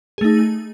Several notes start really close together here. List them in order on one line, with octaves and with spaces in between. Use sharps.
G#4 A3 D#4